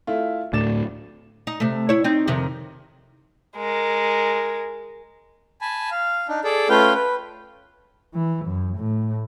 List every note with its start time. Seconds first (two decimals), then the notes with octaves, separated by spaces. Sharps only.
0.07 A3 E4 F4
0.53 D2 A2 D4 D6 A6 E7
1.47 D#4
1.60 C3 A3
1.89 E4 C#5
2.04 C4 D#4
2.27 F2 C3 D#3
3.57 G#3 A#4
5.61 G#5 A5 B5
5.91 F5
6.29 D4 D#4
6.44 G#4 A4 D5
6.69 A3 C#4 F4 B4 F5 G5
6.94 B4
8.14 E3
8.45 F#2
8.77 A2